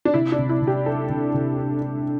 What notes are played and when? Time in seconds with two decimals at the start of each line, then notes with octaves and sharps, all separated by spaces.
0.05 D4
0.14 C3 E4
0.32 D4
0.38 C3
0.49 E4
0.62 C3
0.67 G4
0.86 D4 A4
1.10 C3
1.34 C3
1.58 D4
1.81 D4